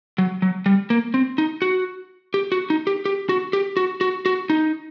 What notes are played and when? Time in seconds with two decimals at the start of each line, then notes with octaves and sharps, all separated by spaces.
0.18 F#3
0.42 F#3
0.66 G3
0.90 A#3
1.14 C4
1.38 D#4
1.62 F#4
2.34 G4
2.52 F#4
2.70 D#4
2.87 G4
3.05 G4
3.29 F#4
3.53 G4
3.77 F#4
4.01 F#4
4.26 F#4
4.50 D#4